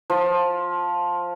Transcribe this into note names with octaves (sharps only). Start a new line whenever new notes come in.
F3